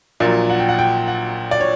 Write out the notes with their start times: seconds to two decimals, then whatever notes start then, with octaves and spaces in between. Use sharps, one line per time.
0.20 A#1 A#2 F#3 D5
0.50 F#5
0.59 G5
0.69 F#5
0.79 G5
1.08 F#5
1.51 D5
1.60 C#5